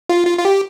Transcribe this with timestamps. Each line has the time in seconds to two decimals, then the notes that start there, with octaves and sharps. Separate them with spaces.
0.09 F4
0.27 F4
0.38 F4
0.45 G4